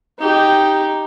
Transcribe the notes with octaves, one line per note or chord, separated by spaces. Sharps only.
D#4 G4